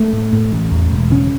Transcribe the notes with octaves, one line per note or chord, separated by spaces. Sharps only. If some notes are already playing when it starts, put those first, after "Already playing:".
Already playing: A3
A2
A2
A1
E2
E1
C#3 C#4